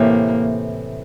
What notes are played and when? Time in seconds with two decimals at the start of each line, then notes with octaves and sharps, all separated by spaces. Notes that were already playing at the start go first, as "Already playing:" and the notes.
Already playing: A2 C3 E3 A#3